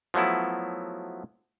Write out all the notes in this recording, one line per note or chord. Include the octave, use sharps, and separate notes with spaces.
F3 F#3 A3 B3 E4